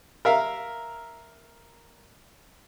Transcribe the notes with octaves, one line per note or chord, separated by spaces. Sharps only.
A#4 E5 F5